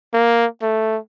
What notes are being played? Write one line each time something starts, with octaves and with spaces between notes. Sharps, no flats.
A#3
A3